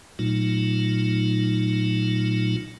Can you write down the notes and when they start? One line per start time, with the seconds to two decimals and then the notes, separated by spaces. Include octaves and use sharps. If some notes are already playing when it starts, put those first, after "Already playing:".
0.19 A#2 F#3 A3 D#4 F4